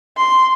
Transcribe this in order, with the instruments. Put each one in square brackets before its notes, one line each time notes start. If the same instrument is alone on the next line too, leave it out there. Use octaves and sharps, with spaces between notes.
[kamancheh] C6